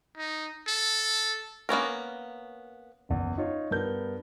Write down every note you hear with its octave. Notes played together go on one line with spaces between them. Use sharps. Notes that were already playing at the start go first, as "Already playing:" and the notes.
D#4
A4
A#3 B3 C#4 A#4
F#1 E2
D#4 F4 C#5
G2 B3 A#4 G6